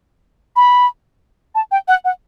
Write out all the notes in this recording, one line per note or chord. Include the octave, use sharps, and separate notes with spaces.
B5
A5
G5
F#5
F#5